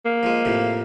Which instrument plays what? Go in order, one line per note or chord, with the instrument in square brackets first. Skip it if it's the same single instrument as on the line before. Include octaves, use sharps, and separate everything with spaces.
[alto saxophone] A#3
[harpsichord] F3 G#3
A2 C3 F3